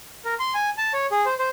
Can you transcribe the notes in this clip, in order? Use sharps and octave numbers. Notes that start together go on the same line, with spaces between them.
A#4
C6
G#5
A5
C#5
G#4
C5
C5